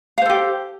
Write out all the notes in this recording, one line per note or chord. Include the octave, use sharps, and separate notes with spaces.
G4 A4 C5 F5